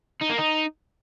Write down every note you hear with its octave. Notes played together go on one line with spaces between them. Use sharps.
D#4
A#3
D#4